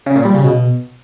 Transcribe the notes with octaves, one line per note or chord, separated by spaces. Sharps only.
C#3
A#2
G3
C#3
B2